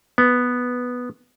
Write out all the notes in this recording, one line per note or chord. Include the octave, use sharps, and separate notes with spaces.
B3